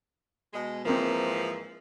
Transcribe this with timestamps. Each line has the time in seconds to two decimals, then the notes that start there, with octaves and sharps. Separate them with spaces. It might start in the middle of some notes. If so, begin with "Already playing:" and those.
0.53 B2 G#3
0.85 G#2 E3 F3 A#3 C4